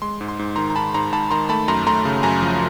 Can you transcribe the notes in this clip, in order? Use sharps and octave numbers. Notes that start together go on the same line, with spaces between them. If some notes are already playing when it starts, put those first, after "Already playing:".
G#3 C6
G#2
C6
G#2
D#3 A#5 C6
A#5
G#2 A5 B5
G#2 A#5 C6
G#2 A5 B5
D#3 A#5 C6
A3 A5 B5
F#2 A#5 C6
A3 A#5 C6
C#3
F#2 G#5 A#5
F3